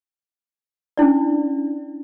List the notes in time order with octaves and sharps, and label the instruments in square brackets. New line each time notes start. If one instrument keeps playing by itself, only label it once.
[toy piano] C#4 D4 E4 D5